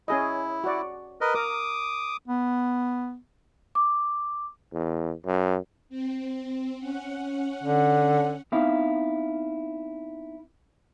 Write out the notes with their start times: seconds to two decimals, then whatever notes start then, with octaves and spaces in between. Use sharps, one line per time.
0.08 C#4 E4 G#4 D#5
0.64 F#4 D5
1.21 A#4 B4 D#5
1.35 A#4 D6 D#6
2.28 B3
3.75 D6
4.73 E2
5.26 F#2
5.89 C4
6.78 C#4 F#5
7.63 D3
8.52 B3 C4 D#4 E4 F5